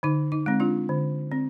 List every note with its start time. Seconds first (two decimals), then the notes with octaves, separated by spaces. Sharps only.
0.03 D3 D#4
0.32 D#4
0.46 G#3 C4
0.60 D4 F4
0.89 D3
1.32 C4